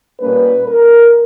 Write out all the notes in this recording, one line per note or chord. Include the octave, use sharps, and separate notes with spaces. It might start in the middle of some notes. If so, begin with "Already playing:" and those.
A#2 G3 A#3 C#4 B4
A#4